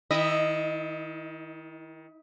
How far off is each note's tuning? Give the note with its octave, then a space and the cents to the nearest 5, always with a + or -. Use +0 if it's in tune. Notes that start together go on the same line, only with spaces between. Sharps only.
D#3 +25 E4 -10 D#5 -10